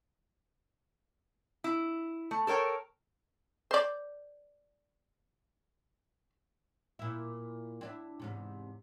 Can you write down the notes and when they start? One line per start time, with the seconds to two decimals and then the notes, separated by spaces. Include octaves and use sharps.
1.64 E4
2.31 A3
2.47 A4 A#4 C#5 G5
3.71 C5 D5
6.99 A#2 E4
7.81 C4 D4 E4
8.20 E2 G#2 C3